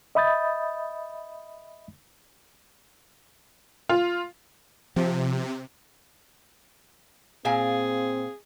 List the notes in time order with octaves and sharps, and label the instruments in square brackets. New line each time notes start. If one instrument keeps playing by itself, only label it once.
[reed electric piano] D#5 E5 B5 D#6 G6 A6
[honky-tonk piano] F4
[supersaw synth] C3 [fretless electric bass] F3
[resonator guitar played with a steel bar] A#2 F5 G#5 [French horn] C4 [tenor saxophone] G#4